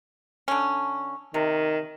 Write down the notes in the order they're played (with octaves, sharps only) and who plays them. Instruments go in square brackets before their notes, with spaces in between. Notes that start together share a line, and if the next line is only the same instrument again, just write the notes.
[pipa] D3 C#4
[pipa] C3 [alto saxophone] D#3